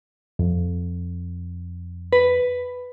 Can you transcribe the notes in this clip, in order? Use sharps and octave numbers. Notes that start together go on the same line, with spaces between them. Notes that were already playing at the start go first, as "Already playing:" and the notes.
F2
B4